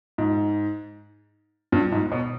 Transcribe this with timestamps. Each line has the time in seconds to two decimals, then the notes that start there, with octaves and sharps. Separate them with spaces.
0.18 G#2
1.72 G2
1.92 G#2
2.12 B2